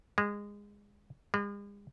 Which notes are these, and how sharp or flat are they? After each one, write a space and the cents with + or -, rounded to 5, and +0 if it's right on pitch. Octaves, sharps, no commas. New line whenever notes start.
G#3 -20
G#3 -45